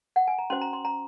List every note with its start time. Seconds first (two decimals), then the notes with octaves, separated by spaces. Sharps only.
0.16 F#5
0.27 G#5
0.38 A#5
0.50 C#4 F#4 C5 C6
0.62 A#5
0.73 C6
0.85 A#5